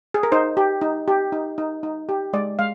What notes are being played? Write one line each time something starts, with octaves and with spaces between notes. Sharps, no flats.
G#4
A#4
D#4 C5
G4
D#4
G4
D#4
D#4
D#4
G4
G#3 D5
G#3 F5